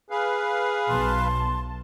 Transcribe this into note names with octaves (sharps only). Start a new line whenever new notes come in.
G#4 B4 F5
B1 A5 C6